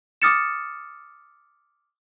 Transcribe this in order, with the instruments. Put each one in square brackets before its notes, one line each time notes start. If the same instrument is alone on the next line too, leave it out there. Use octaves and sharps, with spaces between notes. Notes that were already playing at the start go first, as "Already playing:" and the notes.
[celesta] D6 D#6 F6 A6 C#7 E7